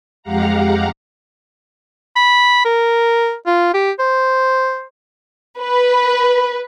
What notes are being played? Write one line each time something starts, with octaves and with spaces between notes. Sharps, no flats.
F2 G#3 G4 F5 F#5 A#5
B5
A#4
F4
G4
C5
B4